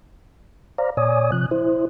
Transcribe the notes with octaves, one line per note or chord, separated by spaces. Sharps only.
C5 D5 F5 A#5
A#2 C#5 D5 G#5 D#6
C3 F3 F#6
E4 C5